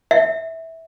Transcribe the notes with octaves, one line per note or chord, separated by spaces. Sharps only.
E5